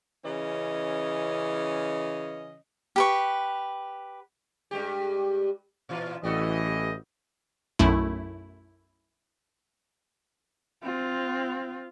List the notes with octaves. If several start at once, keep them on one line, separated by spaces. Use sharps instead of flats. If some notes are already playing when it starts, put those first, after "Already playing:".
C#3 E3 C#4 D#5
G4 B4 C#6
G2 G#3 G4
A#2 E3 F4
A1 E3 G3 F#4 A4 D#5
B1 F#2 A3 E4
C4 F4